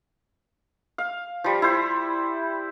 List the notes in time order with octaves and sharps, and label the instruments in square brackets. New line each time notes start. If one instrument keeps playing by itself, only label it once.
[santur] F5
F3 G3
E4 C5